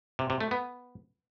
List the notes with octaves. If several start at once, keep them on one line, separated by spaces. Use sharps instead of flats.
C3
C3
A3
B3